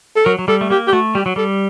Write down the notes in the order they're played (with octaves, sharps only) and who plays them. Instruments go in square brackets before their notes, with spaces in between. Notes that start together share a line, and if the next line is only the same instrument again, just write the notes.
[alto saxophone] A4
[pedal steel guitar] F#3 [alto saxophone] A#4
[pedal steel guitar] F#3
[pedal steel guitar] G3 [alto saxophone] A4
[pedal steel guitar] A3
[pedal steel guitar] A#3 [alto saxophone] G4
[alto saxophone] G4
[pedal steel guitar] A3 [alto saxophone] F#4
[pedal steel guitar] G3 [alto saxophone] G4
[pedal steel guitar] F#3
[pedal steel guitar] G3 [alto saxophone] A4